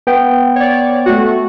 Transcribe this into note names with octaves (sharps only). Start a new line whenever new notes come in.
B3 G5
C#5 D5
A3 F#4